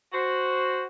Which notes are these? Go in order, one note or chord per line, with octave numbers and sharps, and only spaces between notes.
F#4 C5